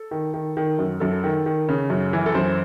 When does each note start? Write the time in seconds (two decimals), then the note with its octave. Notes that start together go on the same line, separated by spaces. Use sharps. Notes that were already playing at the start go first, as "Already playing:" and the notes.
Already playing: A4
0.11 D#3
0.34 D#3
0.57 D#3
0.79 F#2
1.00 F#2 A4
1.24 D#3
1.46 D#3
1.69 C#3
1.90 F#2
2.13 E3
2.26 A4
2.35 F#2 C5